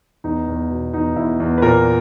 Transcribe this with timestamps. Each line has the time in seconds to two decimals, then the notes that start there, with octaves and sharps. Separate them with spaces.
0.24 E2 D#4
0.48 E2
0.70 B2
0.93 E2 D#4
1.16 E2 E4
1.40 E2
1.58 B4
1.62 A#2 A#4